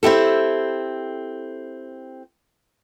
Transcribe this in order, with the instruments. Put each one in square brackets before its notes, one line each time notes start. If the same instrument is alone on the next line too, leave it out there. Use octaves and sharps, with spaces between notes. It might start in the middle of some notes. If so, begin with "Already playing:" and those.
[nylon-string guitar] C4 E4 G4 A4